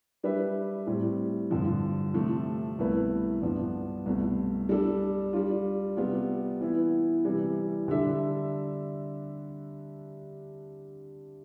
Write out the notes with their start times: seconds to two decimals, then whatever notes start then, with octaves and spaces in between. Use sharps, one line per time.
0.23 G3 D4 G4 B4 E5
0.87 A2 G3 C4
1.51 G2 D3 F3
2.14 C3 F3 A3
2.79 C2 B2 A3 E4 B4
3.41 G2 F3 B3 D4
4.06 C2 B2 A3
4.69 G3 D4 A4
5.33 G3 D4 F4
5.97 C3 G3 B3 F4
6.60 E3 B3 E4
7.25 C3 E3 G3
7.88 D3 G3 D4 A4 E5